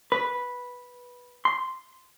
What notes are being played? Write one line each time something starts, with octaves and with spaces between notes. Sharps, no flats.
B4
C6